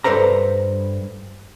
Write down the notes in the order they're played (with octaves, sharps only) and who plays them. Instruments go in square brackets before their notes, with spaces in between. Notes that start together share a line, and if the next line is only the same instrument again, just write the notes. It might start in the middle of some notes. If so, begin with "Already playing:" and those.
[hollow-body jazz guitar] G2 A4 B4 C5 A#5